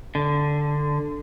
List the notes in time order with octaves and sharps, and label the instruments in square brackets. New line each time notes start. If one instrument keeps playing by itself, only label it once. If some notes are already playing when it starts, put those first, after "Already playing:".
[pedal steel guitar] D3